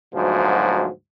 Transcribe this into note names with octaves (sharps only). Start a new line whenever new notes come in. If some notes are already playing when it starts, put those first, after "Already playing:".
D2 G#2 B2 F3 F#3